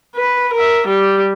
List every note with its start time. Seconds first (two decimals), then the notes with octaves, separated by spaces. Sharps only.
0.16 B4
0.53 A#4 E5
0.87 G3 G4